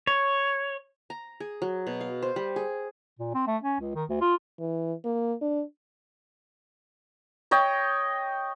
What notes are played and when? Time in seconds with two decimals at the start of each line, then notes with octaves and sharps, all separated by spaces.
0.07 C#5
1.10 A#5
1.40 G#4
1.62 F#3
1.87 B2
2.01 F5
2.22 C5
2.36 G3
2.56 G#4
3.19 A#2
3.35 C4
3.47 A3
3.63 C#4
3.80 C#2
3.95 D#3
4.09 D2
4.21 F4
4.60 E3
5.05 A#3
5.42 D4
7.51 C#5 D#5 G5